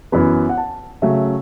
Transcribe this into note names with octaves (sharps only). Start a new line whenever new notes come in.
F#2 E3 B3 B5
F#5
A5
C#3 F#3 A3 C#4 E5